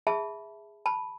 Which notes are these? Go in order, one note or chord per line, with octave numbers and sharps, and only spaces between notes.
G#4 E5 A5 B5
A5 B5